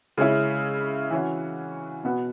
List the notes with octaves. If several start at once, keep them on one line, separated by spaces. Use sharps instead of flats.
C#3 G#3 C#4 E4
E3 C#4 F#4
B2 B3 F#4